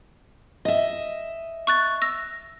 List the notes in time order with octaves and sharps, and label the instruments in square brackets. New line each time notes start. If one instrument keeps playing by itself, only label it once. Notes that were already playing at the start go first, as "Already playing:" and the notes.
[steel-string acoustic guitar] D#5 E5
[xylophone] C#6 F#6 A6
E6 A#6